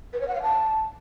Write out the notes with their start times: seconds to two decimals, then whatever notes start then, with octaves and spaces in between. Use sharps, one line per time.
0.13 B4
0.21 C#5
0.28 F#5
0.35 F5
0.42 A5